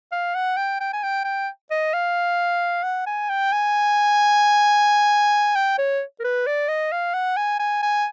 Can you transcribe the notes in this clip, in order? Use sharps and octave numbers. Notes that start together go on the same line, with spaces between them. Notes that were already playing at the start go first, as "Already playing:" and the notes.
F5
F#5
G5
G5
G#5
G5
G5
D#5
F5
F#5
G#5
G5
G#5
G5
C#5
A#4
B4
D5
D#5
F5
F#5
G#5
G#5
G#5